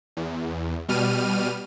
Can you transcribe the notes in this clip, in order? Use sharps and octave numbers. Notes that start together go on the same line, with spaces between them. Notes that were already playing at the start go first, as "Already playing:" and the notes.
E2
B2 G3 F6 D#7